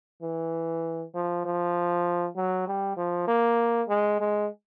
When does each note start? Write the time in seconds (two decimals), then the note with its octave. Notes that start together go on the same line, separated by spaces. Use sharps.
0.22 E3
1.14 F3
1.45 F3
2.36 F#3
2.67 G3
2.97 F3
3.28 A#3
3.89 G#3
4.20 G#3